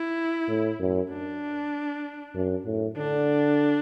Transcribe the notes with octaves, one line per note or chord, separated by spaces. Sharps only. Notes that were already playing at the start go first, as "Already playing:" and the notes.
Already playing: E4
A2
F#2
D4
F#2
A2
D3 D4